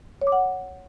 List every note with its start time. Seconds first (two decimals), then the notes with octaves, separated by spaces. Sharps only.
0.22 C#5
0.27 D6
0.32 F#5